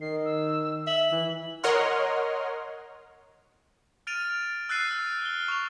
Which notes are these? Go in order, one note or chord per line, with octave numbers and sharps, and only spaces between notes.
D#3 C7
E6
E5 F#7
E3
A#4 C#5 D#5 F#5 C6 F6
F6 A6 D7 D#7 F7
E6 F#6 A6 C7 D#7
E6
F6 G7
C#6 F7